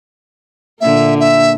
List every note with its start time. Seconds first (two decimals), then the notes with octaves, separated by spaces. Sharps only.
0.81 A#2 D3 A#3 E5
1.20 E5